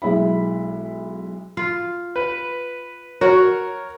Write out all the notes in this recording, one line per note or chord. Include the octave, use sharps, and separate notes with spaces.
B1 G#3 E4 E5 B5
F4
B4
F#4 A#4 C#5